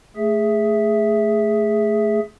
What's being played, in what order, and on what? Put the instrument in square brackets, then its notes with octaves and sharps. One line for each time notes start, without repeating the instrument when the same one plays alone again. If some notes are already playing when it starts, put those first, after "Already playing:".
[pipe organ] A3 G#4 E5